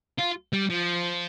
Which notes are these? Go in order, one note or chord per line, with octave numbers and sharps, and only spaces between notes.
F4
G3
F3